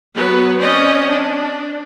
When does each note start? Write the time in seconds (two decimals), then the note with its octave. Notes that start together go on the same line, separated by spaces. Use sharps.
0.13 F#3 B3 B4
0.59 C4 C#4 D5 D#5
1.10 D4